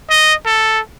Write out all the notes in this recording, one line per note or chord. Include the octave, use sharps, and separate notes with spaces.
D#5
A4